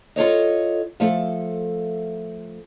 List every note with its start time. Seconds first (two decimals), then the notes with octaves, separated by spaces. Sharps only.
0.16 F4 A4 C#5 D#5
1.00 F3 A3 A4